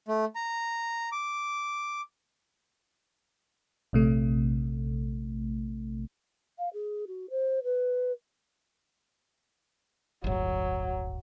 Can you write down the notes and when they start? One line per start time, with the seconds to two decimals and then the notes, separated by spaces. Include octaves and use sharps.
0.08 A3
0.35 A#5
1.12 D6
3.93 A#1 C3 A3
6.58 F5
6.73 G#4
7.07 F#4
7.31 C5
7.64 B4
10.24 D1 G1 F#3